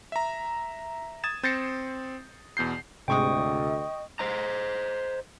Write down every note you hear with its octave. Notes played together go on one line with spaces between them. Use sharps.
E5 A#5
D#6 G#6 A6 E7
C4 G6 A6 A#6 C7 C#7
E2 B2 G6 C7
D2 G#2 C3 G#3 D#5 G5 C#6 D#6
C5 D#5 A#5